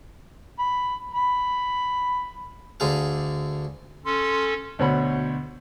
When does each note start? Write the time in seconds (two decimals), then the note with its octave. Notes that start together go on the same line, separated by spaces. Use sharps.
0.59 B5
1.14 B5
2.80 D2 D3 G#4 F5
4.05 C#4 A4 C6
4.79 D2 B2 C5 C#5 F#5 B5